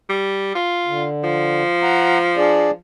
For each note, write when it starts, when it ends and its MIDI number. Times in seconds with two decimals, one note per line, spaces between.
0.09 0.54 55
0.55 1.04 65
0.87 1.63 50
1.23 2.75 53
1.83 2.18 78
1.83 2.18 82
2.37 2.71 62
2.37 2.71 68
2.37 2.71 74